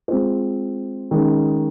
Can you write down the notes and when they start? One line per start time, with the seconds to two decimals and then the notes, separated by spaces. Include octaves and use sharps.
0.08 G#3 C4 F4 C5
1.11 D#3 G#3 C#4